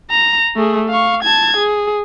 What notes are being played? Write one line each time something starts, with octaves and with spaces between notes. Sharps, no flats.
A#5
A3 G#4
F5 C#6
A5 G#6
G#4